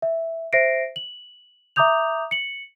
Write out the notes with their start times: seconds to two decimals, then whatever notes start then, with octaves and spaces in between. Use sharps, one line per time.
0.02 E5
0.53 C5 E5 A#6 C7 D7
0.96 F#7
1.76 E5 A#5 D6 D#6 G6 F7
2.31 C#7 F#7